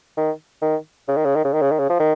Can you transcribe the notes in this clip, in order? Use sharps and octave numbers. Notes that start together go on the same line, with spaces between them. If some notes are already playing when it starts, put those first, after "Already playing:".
D#3
D#3
C#3
D#3
C#3
D#3
C#3
D#3
C#3
D#3
C#3
F3
D#3